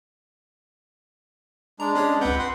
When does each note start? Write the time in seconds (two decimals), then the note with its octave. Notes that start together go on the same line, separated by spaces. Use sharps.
1.80 G#3 D4 A#5
1.95 C#4 G#4 C#5
2.21 C#2 C4 B4 F#5 G6
2.39 F#5 C6